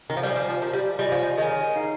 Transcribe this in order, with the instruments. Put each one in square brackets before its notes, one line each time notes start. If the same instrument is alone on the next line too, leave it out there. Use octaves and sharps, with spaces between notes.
[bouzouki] D#3
F3
[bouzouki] G3 [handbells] G4 C5 F5 G#5
[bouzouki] F3
F3
[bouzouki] F3 [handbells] G4 A#4 D#5
[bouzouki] G3
[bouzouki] G3 [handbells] F4 G#4 D#5 G#5
[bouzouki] F3
[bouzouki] D#3 [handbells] G#4 C#5 G#5
[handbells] D#4 A#4 F5